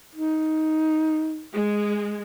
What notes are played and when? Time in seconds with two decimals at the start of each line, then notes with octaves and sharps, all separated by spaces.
0.15 D#4
1.53 G#3